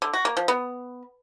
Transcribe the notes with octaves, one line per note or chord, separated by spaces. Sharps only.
D3
F#4
A#3
F3
B3